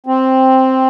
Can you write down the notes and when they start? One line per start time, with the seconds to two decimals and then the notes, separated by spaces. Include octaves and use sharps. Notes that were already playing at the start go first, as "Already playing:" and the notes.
0.06 C4